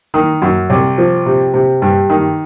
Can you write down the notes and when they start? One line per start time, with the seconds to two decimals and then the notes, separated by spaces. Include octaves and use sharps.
0.14 D#3
0.42 F#2
0.70 C2
0.98 F3
1.26 C3
1.54 C3
1.82 G2
2.10 D#3